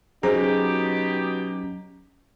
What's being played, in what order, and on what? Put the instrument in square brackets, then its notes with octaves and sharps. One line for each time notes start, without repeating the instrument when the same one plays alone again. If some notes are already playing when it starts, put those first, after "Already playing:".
[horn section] B2 D#4 G4 [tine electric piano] F#3 C#4 A#5 [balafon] G#4 C5